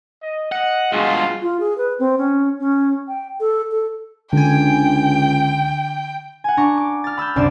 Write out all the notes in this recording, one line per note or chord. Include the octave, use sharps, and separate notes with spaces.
D#5
D#5 F#5
G2 B2 G#3 F4 F#4 G#4
F4
G#4
B4
C4
C#4
C#4
G5
A4
A4
C#2 D3 G5 G#5
F#5 G#5
D4 A#5 C#6
D6
F6 A6
B5 E6 F6 G6
F#1 C2 D4 D5 C7 E7